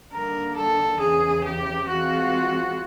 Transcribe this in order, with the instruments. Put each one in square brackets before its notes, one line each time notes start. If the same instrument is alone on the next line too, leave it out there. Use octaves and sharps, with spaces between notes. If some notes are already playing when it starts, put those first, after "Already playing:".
[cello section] D#2 D3 G3 A#3 D4 [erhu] A#4
[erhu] A4
[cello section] E2 C#3 E3 [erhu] G#4
[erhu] G4
[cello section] E3 G#3 C4 F4 [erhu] F#4